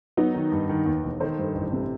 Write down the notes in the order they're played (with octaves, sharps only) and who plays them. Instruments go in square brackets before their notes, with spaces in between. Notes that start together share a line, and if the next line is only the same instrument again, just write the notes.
[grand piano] F#3 [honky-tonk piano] B3 D#4
[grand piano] D#3
G2
D#3
D#2
E1
[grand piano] D#3 [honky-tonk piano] A4 C5
[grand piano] G2
A1
C3